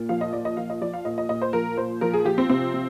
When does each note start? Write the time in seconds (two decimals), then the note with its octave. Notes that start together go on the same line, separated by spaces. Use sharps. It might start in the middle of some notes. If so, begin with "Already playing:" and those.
Already playing: A#2
0.09 F3 F5
0.21 D#5
0.33 A#2 D5
0.45 D#5
0.57 F3 F5
0.70 D#5
0.81 F3 D5
0.94 F5
1.05 A#2 D#5
1.18 D#5
1.29 A#2 D#5
1.42 C5
1.53 F3 A#4
1.77 A#2 C5
2.01 F3 A#4
2.13 G#4
2.25 F3 G4
2.38 C4
2.49 C3 C4
2.74 C3